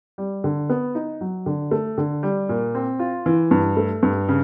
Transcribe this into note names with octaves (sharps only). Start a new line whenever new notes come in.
G3
D3
B3
D#4
F#3
D3
A3
D3
G3
A#2
C4
F4
E3
G2
A3
G2
C#3